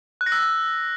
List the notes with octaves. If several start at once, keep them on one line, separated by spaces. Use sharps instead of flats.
F#6
A#6
E6